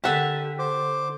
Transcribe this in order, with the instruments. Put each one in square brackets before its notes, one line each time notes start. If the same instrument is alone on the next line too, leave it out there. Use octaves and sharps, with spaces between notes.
[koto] D3 E5 A5 [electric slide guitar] G4 [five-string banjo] A#4 F#5
[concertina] C5 D6